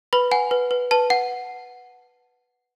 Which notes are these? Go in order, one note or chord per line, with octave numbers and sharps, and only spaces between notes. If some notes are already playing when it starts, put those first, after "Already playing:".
B4 B5
F#5 G#5
B4
B4
B4 A5
F#5